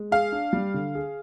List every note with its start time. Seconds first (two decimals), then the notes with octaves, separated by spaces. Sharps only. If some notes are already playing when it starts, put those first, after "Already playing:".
Already playing: G#3
0.11 G#4 F5
0.32 D4
0.53 G3
0.74 D3
0.95 G#4